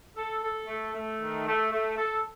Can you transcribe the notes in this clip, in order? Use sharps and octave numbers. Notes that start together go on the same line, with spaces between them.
A4
A4
A3
A3
D#3
A3
A3
A4